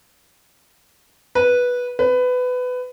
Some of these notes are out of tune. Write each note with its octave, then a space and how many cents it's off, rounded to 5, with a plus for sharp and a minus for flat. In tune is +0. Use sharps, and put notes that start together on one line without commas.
B4 -10
B4 +20